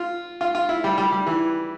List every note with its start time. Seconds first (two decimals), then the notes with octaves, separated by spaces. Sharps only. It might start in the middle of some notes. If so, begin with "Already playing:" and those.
Already playing: F4
0.41 F4
0.55 F4
0.69 E4
0.84 G3
0.98 G3
1.12 G3
1.27 E3